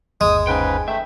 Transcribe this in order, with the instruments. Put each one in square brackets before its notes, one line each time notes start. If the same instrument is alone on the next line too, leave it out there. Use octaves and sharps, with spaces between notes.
[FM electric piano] G1 D#2 [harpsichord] G#3 [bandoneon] D#6
[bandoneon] G#2 C#3 B4 [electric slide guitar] G5 G#5
[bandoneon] A3 [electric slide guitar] E5 [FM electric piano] G5